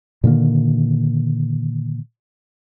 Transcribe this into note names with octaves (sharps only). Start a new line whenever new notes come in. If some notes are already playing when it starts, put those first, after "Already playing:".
A#2 D3 D#3 A#3